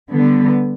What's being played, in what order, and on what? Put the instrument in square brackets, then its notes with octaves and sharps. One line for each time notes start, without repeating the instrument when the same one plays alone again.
[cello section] D3 G3 B3